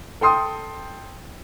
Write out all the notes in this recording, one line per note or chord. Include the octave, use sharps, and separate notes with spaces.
A4 G5 C6 D#6